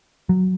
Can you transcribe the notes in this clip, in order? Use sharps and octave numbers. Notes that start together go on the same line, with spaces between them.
F#3